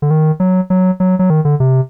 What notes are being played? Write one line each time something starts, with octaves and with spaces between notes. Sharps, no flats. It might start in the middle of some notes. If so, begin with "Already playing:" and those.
D3
D#3
F#3
F#3
F#3
F#3
D#3
D3
C3